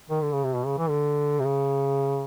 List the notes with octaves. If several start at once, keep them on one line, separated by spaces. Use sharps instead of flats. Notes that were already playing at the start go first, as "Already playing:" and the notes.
D#3
D3
C#3
C3
B2
C#3
E3
D3
C3
C#3